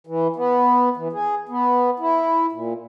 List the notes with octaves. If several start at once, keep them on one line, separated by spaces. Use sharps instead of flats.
E3
B3
E3
G#4
B3
E4
A#2